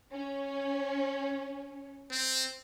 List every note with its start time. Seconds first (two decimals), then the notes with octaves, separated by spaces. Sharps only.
0.13 C#4
2.11 C4